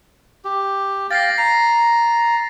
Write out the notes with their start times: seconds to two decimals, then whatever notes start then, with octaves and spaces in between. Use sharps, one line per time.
0.45 G4
1.11 F5 G5 A6 A#6 C7
1.38 A#5 C7